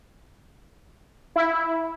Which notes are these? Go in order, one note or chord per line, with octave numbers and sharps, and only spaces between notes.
E4